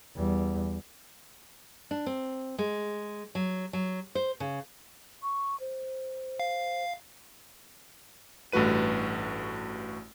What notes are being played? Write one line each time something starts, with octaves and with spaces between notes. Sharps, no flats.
E2 G3
D4
C4
G#3
F#3
F#3
C5
C#3
C#6
C5
F5
A1 G2 A3 F#4 B4 D#7